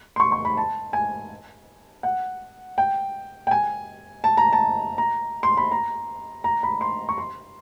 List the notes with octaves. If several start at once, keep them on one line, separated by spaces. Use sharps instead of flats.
C6
C#6
C#6
B5
A5
G#5
F#5
G5
G5
G#5
A5
A#5
A5
A#5
C6
B5
A#5
A#5
B5
C6
C#6
C6